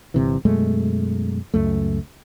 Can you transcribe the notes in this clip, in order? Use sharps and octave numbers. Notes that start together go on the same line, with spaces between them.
G1 C3 E3
F#2 B2 G#3 A3
C#2 F#2 A3